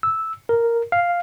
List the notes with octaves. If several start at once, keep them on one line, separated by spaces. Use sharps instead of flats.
E6
A#4
F5